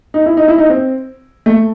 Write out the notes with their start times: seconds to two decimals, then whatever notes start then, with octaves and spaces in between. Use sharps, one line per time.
0.14 D#4
0.26 E4
0.37 D#4
0.48 E4
0.58 D#4
0.70 C4
1.46 A3